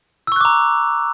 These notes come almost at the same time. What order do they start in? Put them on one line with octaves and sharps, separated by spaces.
E6 C#6 F#6 D6 A#5